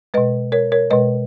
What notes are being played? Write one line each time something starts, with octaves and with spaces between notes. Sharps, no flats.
B2 G#3 B4 D#5
A#4 C#5
A#4 C#5
B2 G#3 B4 D#5